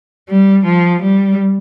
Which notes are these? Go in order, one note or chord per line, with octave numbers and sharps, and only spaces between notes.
G3
F3
G3